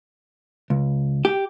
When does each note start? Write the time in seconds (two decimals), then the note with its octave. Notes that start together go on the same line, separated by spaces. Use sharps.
0.70 C#2
1.25 G4